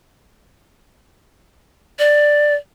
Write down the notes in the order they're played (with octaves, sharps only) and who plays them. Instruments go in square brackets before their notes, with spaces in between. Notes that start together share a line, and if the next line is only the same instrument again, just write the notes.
[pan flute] D5